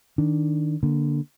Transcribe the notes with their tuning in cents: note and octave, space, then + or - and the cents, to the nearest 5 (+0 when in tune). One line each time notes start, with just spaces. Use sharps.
D#3 +0 D4 +0
D3 +0 A#3 +20